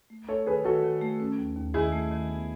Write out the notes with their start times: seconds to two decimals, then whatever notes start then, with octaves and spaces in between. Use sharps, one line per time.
0.10 A3
0.28 A3 A4 C#5
0.47 D#3 G#4 B4
0.65 D#3 F#4 A4
0.84 D#3
1.01 A3
1.20 C#4
1.38 D#2
1.57 D#2
1.74 D#3 E4 G#4
1.92 A3
2.11 D#3
2.29 B3